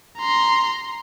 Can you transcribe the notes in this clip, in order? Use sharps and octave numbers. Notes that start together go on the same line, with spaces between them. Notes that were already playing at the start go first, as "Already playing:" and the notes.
A#5 C6